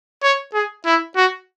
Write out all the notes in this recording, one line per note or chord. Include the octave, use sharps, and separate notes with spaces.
C#5
G#4
E4
F#4